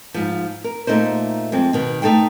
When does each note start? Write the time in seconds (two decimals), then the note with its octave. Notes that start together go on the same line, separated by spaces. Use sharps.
0.14 G#2 F3
0.64 A#4
0.87 A#2 A3 D#4 A#4 C5
1.52 F2 G#3 C4
1.73 B2 D#3
2.02 A3 D#4 A4 C5 G5